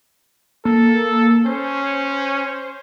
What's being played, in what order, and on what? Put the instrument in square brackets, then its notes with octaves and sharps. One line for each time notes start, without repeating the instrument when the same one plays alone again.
[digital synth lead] A#3 [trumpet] A4
[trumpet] C#4 [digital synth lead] C5